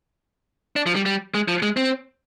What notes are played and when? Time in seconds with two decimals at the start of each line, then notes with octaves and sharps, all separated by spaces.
0.76 D4
0.86 F3
0.95 G3
1.06 G3
1.34 G#3
1.48 F3
1.62 G#3
1.77 C4